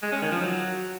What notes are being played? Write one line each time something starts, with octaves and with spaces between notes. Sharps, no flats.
G#3
C#4
D#3
F3
F#3